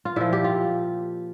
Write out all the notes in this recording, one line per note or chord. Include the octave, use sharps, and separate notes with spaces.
F4
A#2 F3 E4
G4
F4